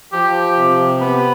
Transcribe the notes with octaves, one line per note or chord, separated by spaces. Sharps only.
F3 G4
C3
B3 B4